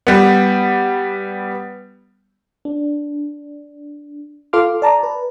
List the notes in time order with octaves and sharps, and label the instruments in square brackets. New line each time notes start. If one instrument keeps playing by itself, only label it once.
[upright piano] G3 B3
[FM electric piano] D4
F4 A4 F5 C6 D6 F6
D5 A5 A#5
B4